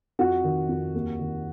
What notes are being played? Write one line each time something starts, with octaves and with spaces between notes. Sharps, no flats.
F2 F#4
D#3
F2
D#2
D#3